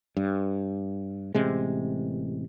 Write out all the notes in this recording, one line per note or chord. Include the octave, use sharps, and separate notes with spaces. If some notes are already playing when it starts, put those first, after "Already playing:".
G2
A1 C3 G#3